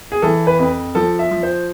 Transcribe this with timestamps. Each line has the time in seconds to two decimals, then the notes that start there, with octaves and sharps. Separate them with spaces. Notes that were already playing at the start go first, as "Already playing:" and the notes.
0.12 G#4
0.22 E3 A4
0.47 B4
0.59 F2
0.95 F3 A4
1.19 E5
1.31 F3
1.43 C5